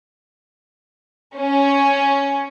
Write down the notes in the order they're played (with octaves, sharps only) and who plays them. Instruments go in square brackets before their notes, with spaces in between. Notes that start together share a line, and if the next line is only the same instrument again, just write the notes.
[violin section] C#4